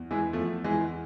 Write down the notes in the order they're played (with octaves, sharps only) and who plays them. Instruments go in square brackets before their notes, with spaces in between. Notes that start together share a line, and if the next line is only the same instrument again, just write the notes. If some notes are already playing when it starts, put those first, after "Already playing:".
Already playing: [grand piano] E2
E3 G#3
E2 F3 A3
E3 G#3
E2